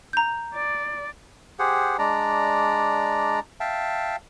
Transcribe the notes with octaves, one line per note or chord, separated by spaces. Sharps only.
A#5 G6
D5
G4 G#4 C5 F#5
G#3 D4 D5 A#5
E5 F5 G5 A5